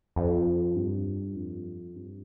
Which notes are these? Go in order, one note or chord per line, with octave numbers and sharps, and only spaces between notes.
F2
G2
F2
G2